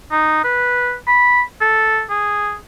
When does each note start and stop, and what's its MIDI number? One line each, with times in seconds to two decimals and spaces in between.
0.12 0.42 63
0.44 0.95 71
1.07 1.42 83
1.61 2.03 69
2.10 2.55 68